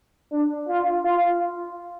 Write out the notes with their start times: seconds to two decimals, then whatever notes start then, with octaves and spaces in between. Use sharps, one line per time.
0.31 D4
0.68 F4
1.05 F4